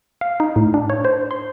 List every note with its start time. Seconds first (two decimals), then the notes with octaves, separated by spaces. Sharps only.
0.21 F5
0.40 D#4
0.56 A2
0.74 D4
0.90 C#5
1.05 C5
1.31 C6